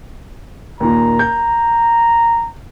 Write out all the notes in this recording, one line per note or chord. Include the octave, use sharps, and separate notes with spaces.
D#2 A#2 A#5
G6